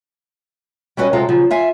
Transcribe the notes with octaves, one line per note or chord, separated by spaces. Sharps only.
G3 C#4 F#4 A#4 B4 D#5
C3 F#3 G#3 F4 A4
C#3 F3 F#3
F4 E5 G#5